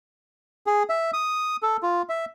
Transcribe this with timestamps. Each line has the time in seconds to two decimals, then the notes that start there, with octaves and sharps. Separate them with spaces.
0.67 G#4
0.90 E5
1.13 D#6
1.63 A4
1.83 F4
2.09 E5